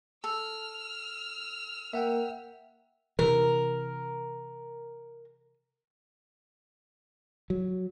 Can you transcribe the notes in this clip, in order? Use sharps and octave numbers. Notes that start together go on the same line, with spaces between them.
A4 E6 F6
A#3 E5 F#5 G5
C3 E3 A#4
F#3